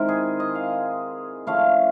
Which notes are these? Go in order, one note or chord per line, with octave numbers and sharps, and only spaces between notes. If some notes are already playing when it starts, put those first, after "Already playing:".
Already playing: D#3 G#3 C4 E4 A#4
G#4
D#5
F5
F3 A3 C#4 E4 F5